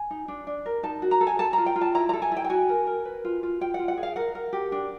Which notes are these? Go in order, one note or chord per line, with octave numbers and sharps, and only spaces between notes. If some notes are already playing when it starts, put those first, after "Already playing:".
Already playing: G#5
D#4
D4
D4
A#4
D#4 A5
F#4
A#5
A4
G#5
A4 A5
A#5
F4
G5
F4
A5
E4 A#5
A#5
A4
G#5
E4 G5
G5
F#4 G#5
A#4
A#4
B4
F4
F4
F4 G5
F#5
F4
F#5
G#4
F5
A#4 F#5
A#4
G4
D4